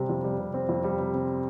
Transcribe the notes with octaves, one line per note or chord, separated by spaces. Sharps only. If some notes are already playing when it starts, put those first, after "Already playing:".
Already playing: C3 G3 C4
F2
G3
C3
C4
F2
G3
C3
C4